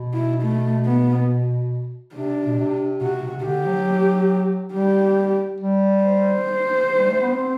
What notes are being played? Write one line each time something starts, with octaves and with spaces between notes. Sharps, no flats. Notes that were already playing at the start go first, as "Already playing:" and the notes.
Already playing: B2
E4
A3
B3
C3 D4
B2
C3
C3 F#4
C3
C3
D3 G4
F#3
G3 G4
G3
C5
G3
A3
B3
C4